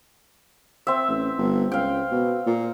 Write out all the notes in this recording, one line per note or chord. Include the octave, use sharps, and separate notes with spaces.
C4 E5
A1
G1
C#2 F5 G5
B2
A#2